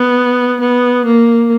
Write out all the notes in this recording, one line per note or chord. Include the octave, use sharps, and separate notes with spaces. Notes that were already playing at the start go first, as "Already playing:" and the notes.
Already playing: B3
B3
A#3